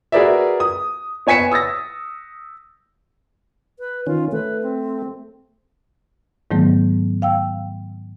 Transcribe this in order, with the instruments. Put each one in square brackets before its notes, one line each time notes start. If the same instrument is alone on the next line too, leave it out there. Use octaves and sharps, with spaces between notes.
[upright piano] F#4 G#4 A#4 B4 D5 E5
D#6
B3 C#5 G#5 B6 C#7 E7
D#6 E6 A6 A#6
[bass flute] B4
[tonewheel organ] D#3 C#4 [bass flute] F4
[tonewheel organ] A3 [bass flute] B4
[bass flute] C4
[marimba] G#2 D#3 F#3 A3 B3
F5 G5 E6